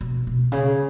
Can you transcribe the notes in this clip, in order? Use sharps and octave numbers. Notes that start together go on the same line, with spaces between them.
B2
B2
C#3